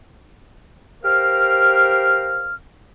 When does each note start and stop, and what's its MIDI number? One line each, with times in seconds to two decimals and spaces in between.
1.03 2.53 67
1.03 2.53 70
1.03 2.53 72
1.03 2.53 77
1.03 2.53 89